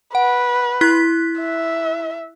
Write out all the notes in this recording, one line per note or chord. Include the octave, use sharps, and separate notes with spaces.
B4 F#5
E4 F#6 B6
E5